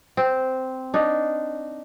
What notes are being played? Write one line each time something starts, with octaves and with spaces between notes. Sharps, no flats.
C4
D4 D#4